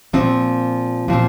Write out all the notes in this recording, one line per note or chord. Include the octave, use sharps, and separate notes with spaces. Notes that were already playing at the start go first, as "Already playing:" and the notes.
A#2 F3 C4
A#2 F3 C4